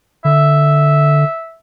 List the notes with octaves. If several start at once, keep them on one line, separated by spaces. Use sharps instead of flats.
D3 E5